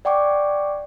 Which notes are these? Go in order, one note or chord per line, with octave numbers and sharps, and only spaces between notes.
D5 F#5 G5 C#6 D6